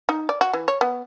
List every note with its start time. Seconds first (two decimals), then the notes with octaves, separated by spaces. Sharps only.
0.09 D#4
0.29 D5
0.41 F#4
0.53 E3
0.68 C#5
0.81 B3